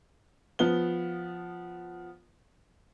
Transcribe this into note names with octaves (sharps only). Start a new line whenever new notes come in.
F3 B3 G7